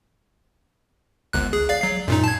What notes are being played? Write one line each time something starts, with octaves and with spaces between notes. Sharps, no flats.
G1 C#2 F#6
G#4
D5 F5
F#3 C7
F#2 A#2 D#4
A5 G#6